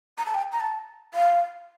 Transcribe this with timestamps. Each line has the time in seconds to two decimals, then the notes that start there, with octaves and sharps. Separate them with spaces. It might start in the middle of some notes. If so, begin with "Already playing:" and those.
0.18 A#5
0.25 A5
0.34 G5
0.52 A#5
0.60 A5
1.14 F5